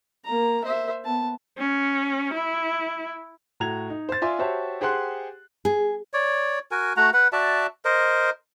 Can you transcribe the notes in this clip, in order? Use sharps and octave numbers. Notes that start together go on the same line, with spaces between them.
A#3 A#5
C5 E5
B3 A5
C#4
E4
A2 F#4 A#5 G#6 F7
D#4
C5 A6
F4 D5 E5 G#5 C6
F#4 G4 C5 C#5 E5 A5
G4 G#4 C5 F#5 C6 F#6
G#4
C#5 D5
F#4 A#4 G#5
A3 F#4 F#5 A#5
B4 F#5
F#4 D5 E5 A5
A#4 C5 D#5